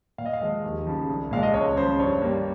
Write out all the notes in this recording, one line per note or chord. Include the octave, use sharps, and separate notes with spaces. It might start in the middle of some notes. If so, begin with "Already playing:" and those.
A#2 F5
D#5
F5
F3 G#3 D#5
D#2
C#3 F3
C2
A#2 F3 G#3 F5
D#5
C#2 C#5
C#3 F3 C5
G2 C#5
G3 A#3